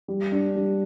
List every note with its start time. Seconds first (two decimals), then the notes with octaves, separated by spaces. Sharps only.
0.08 G3
0.32 D4
0.56 G3